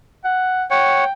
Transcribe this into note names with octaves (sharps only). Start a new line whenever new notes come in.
F#5
C#5 F#5 G5